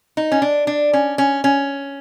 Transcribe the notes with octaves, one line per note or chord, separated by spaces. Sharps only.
D#4
C#4
D4
D4
C#4
C#4
C#4